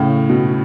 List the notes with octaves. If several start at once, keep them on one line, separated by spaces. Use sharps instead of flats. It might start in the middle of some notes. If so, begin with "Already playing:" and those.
Already playing: A2 C#3
B2